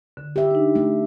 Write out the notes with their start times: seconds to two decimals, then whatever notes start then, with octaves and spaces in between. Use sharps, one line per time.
0.17 D3
0.36 G4 E5
0.51 D4 D#4
0.75 A3